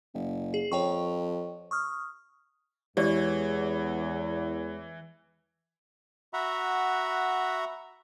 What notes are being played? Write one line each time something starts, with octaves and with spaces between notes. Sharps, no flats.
F#1
G#4
F2 C#5 G5 C#6
C#6 D#6 F6
E2 E3 G#3 G4 C#5 D5
F#4 E5 F#5 A#5 B5